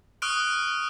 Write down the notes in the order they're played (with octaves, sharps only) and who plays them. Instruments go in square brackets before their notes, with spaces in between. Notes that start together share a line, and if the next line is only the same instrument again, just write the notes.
[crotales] C#6 D#6 F6 F#6 D7